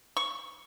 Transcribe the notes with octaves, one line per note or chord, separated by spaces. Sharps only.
C#6